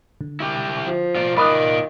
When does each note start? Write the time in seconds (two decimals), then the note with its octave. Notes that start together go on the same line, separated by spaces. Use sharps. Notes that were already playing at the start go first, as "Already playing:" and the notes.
0.21 D3
0.40 E4 G4
0.86 F3
1.15 F4 D5
1.37 D#3 F4 D5 B5 D#6 F#6